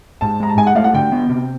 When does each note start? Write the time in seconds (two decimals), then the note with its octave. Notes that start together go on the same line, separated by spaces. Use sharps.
0.21 G#2 A5
0.40 G#3 A#5
0.49 A5
0.57 G#2 G#5
0.67 F#5
0.75 A3 F5
0.84 F#5
0.94 D3 G5
1.12 B3
1.29 C3